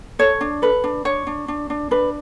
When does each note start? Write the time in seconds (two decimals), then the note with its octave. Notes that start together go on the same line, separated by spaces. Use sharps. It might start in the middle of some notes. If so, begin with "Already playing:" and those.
0.19 A4 C#5
0.41 D4
0.62 A4 B4
0.84 D4
1.05 D4 C#5
1.27 D4
1.48 D4
1.70 D4
1.91 D4 B4